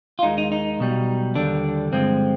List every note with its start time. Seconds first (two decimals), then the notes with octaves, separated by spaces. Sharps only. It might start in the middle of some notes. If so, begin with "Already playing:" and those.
0.19 F4
0.23 D#2 D#3 G#3 D#4
0.38 D#4
0.52 D#4
0.79 B1 B2 G3
1.35 D#2 D3 G3 D4
1.92 G2 D3 F3 G#3 C4